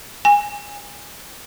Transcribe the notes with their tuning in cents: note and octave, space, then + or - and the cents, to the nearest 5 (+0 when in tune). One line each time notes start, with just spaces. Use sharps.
G#5 -15